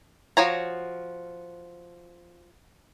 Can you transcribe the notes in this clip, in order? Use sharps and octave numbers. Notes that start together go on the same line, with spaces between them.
F3 F#4 C#5 A#5